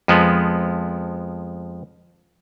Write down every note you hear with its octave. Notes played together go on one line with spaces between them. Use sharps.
F2 F3 G#3 B3